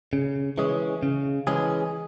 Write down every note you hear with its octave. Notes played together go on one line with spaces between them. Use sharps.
C#3
E3 G#3 C#4 G#4
C#3
E3 G#3 C#4 G#4